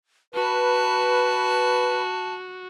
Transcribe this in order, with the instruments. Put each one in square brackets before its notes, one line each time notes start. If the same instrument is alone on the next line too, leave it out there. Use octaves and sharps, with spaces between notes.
[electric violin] F#4 [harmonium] B4 [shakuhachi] A5